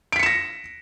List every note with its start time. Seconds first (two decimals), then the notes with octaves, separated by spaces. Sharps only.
0.12 D7
0.16 B6
0.19 C#7
0.23 E7
0.26 A#6